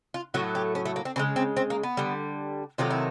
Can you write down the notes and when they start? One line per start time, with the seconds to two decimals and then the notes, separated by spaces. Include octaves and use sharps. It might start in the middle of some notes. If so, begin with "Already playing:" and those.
0.14 F4
0.34 A2 F#3 A3 F#4
0.55 G4
0.75 C#4
0.85 A3
0.96 A#3
1.05 C4
1.16 C#3 E3 G#3 C4
1.36 C4
1.57 C4
1.70 A#3
1.83 B3
1.97 D3 G3
2.78 C3 D#3 F#3 A3 F4
2.90 E4